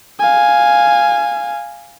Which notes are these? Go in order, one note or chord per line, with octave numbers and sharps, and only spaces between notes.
F5 G#5